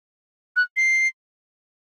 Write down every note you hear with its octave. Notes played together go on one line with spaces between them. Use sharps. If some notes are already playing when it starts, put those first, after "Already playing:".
F#6
C7